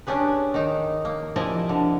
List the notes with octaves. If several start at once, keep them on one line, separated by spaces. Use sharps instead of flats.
C#4 D4 G4 G#4 B4
D#3 D#4
A#3
C3 F3 E4 D5 D#5 G#5
D3